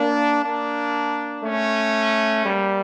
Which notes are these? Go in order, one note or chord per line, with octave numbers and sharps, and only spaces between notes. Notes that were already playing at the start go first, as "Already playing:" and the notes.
Already playing: A#3 D4
A#3 D4
A3 C#4
G3 A#3